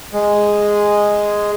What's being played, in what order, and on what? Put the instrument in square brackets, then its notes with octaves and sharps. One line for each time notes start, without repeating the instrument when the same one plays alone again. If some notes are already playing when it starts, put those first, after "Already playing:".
[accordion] G#3